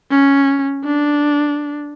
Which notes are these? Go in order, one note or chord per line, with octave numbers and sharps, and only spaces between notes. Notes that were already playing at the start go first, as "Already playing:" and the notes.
C#4
D4